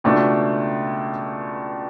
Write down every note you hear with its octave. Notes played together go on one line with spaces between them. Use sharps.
C#2 B2 A3 D4